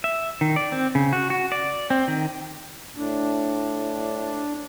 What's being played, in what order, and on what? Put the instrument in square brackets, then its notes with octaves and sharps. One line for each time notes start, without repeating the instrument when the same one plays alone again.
[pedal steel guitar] E5
D#3
D5
C4
C#3
F#4
F#4
D5
C4
D#3
[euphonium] A2 [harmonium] D4